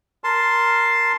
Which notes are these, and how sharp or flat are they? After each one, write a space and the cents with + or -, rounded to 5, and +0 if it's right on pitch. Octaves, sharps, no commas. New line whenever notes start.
A#4 +0 A5 +0 C6 +0